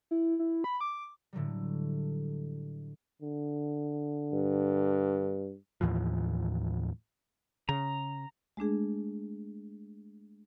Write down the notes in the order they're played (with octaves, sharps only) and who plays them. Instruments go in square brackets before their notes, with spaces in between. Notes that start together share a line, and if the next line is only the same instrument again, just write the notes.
[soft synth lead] E4
E4
B5
D6
[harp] A2 D3 F#3 G3
[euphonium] D3
[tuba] G2
[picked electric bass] D#2 A2 E3 F3
[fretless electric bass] C#3 [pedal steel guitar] A#5
[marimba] G#3 A3 D4 G#4